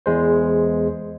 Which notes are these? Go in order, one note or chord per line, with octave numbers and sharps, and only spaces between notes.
E2 G#3 C5